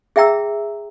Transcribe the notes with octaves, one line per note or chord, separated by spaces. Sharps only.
G#4 E5 G5 A#5 E6